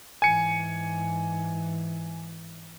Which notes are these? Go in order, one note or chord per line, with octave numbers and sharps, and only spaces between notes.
G#2 E3 G#5 C#7